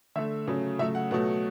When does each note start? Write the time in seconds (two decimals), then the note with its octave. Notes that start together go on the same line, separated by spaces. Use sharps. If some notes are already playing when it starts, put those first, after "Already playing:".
0.16 D3 A3 E5
0.48 C#3 F#3 A3
0.79 C#3 F#3 A3 E5
0.95 F#5
1.11 B2 F#3 A3 F#5